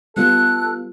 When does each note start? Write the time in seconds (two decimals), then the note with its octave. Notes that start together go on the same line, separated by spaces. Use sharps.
0.17 G3 B3 F4 A4 F#6